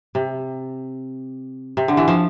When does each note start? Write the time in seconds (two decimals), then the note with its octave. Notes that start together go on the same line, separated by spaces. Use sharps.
0.15 C3
1.77 C3
1.88 D3
1.97 E3
2.08 F3